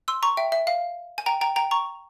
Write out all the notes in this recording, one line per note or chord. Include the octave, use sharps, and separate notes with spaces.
C6 E6
A#5 C#6
E5 G5
E5
F5
G#5
G5 A#5
G5 A#5
G5 A#5
A#5 C#6